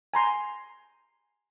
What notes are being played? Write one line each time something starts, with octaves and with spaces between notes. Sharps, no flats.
G#5 A#5 C6